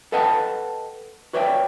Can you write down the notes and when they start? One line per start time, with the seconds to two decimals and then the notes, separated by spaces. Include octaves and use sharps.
0.12 A4 B4 D#5 F#5 G5 A5
1.33 F#4 B4 C#5 D5 E5 G5